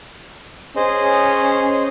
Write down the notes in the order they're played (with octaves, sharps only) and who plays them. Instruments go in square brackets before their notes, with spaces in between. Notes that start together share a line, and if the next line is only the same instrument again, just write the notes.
[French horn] C#4 [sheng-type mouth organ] G#4 C5 D#5